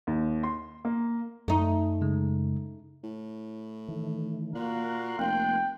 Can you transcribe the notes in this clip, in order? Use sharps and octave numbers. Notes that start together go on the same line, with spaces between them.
D#2
C6
A#3
F#2 A3 D#4
C#3 G#3
A2
D#3 E3 A3
A#2 A#3 F#4 A#4 F5 C6 F#6
F1 G5